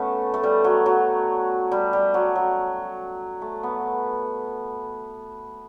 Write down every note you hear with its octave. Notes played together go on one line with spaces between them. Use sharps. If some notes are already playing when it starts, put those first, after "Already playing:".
Already playing: A3 B3 C#4
A3
G3
F#3
F#3
G3
G3
F#3
F#3
A3
B3